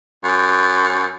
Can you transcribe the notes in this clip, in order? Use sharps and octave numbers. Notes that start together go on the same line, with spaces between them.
F#2